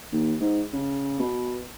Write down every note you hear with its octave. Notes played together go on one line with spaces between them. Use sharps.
D#2
G#2
C#3
B2